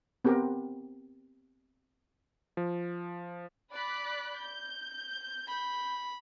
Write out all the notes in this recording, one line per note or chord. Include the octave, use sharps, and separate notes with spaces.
B3 C4 G4 A#4
F3
D5 B5 F#6
G6
B5